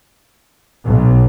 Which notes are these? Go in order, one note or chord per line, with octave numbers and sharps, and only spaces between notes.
B1